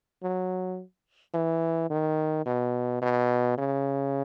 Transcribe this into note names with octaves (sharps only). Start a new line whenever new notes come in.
F#3
E3
D#3
B2
B2
C#3